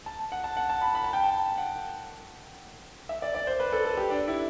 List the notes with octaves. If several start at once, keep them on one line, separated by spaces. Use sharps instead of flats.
A5
F#5
A5
F#5
A5
B5
B5
A5
G5
A5
F#5
E5
D5
D5
C5
B4
A4
A4
G4
D4
E4